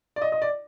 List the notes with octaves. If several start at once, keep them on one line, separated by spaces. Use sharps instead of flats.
D5
D#5
D#5
D5